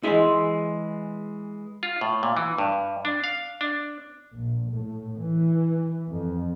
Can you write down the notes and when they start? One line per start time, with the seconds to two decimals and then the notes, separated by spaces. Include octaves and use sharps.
0.03 E3 G#3 E4 G#4 E5
1.83 F4
2.01 A2
2.23 A#2
2.37 E3
2.58 G2
3.05 D4
3.24 F5
3.61 D4
4.34 A#1
4.70 A2
5.16 E3
6.08 F2